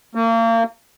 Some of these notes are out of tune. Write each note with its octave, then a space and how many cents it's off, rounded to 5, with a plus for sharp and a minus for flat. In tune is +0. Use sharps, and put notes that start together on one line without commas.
A#3 -35